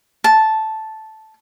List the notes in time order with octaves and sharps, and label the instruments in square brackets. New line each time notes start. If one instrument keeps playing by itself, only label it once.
[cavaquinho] A5